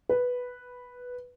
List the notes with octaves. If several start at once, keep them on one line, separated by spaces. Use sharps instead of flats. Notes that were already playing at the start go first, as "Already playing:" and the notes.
B4